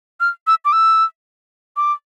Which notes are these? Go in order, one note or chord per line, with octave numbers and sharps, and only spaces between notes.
F6
E6
D6
E6
D6